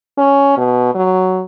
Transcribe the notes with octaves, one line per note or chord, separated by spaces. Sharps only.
C#4
B2
F#3